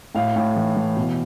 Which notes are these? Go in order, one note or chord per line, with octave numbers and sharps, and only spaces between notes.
A2 F5
A2
E3
E3
B2